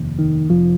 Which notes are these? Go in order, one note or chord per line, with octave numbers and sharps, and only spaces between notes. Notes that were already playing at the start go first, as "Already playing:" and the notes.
Already playing: F1 D#2
D#3
F1 F3